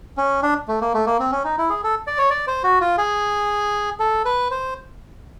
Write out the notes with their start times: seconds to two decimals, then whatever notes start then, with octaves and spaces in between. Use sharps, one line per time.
0.17 C#4
0.43 D4
0.68 A3
0.81 A#3
0.94 A3
1.06 A#3
1.20 C4
1.32 C#4
1.44 D#4
1.58 E4
1.70 G#4
1.84 A4
2.07 D5
2.18 C#5
2.30 D5
2.47 C5
2.63 F#4
2.81 F4
2.98 G#4
4.00 A4
4.25 B4
4.51 C5